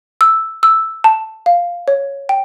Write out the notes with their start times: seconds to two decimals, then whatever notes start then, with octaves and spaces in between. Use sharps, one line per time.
0.21 E6
0.63 E6
1.04 A5
1.46 F5
1.88 C#5
2.29 G5